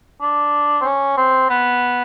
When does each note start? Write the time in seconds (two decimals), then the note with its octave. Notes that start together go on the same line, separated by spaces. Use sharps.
0.21 D4
0.81 C4
0.84 C#4
1.17 C4
1.50 B3